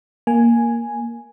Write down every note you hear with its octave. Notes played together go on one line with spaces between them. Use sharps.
A#3 G#5